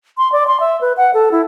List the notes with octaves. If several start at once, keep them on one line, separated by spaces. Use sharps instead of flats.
C6
D5
C6
E5
B4
F#5
A4
E4